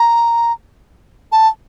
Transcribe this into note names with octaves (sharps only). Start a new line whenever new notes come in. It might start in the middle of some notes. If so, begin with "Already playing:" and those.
Already playing: A#5
A5